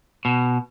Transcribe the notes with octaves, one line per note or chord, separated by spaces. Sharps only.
B2